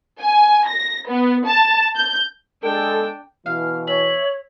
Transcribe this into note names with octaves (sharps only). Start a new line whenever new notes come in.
G#5
A#6
B3
A5
G6
G#3 D4 A4 G5
B2 E3 F5
C#5 E5 F#7